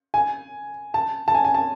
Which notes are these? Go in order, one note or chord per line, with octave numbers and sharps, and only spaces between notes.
G#5
A5
A5
G#5
G#5
A5